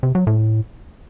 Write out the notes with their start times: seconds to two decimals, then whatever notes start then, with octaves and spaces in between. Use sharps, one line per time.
0.03 C3
0.15 F#3
0.27 A2